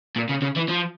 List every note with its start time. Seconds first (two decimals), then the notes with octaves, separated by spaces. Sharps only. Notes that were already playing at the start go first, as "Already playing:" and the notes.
0.16 A#2
0.29 C#3
0.42 C#3
0.56 E3
0.69 F3